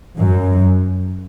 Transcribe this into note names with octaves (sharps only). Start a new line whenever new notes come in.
F#2